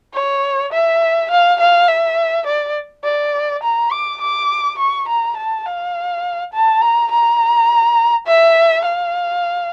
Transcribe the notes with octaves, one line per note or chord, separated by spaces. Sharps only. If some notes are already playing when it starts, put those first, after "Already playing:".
C#5
E5
F5
F5
E5
D5
D5
A#5
D6
D6
C#6
A#5
A5
F5
A5
A#5
A#5
E5
F5